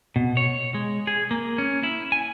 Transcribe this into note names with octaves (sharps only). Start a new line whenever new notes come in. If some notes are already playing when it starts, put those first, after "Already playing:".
B2
C#5
G#3
G#4
A#3
C#4
E4
G#5